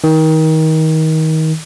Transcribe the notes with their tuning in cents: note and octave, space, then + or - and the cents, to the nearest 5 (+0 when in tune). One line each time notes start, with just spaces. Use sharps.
D#3 +25